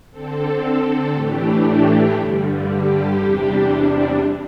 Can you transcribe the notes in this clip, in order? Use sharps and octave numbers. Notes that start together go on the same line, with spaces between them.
D3 C4 A4
A2 E3 A3 D4 G4
G4
G2 D3 G3
G4
E2 C3 G3 D4